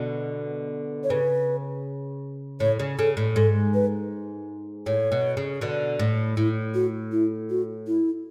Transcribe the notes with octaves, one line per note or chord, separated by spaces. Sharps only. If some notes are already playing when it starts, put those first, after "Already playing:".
Already playing: B2 D3
C#5
C#3 B4
A2 C#5
C#3
C#3 A4
A2
G#2 A4
B4
A2 C#5
B2
C#3
B2 D3
A2
A2 E4
F#4
E4
F#4
E4